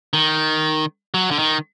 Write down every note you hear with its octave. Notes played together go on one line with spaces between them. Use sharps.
D#3
F#3
D3
D#3